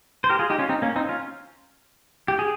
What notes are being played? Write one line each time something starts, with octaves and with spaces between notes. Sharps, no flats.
C5
G4 A#4
F4 G#4
D#4 G4
C#4 F4
C4 D#4
A#3 C#4
C4 D#4
C#4 F4
G4
G#4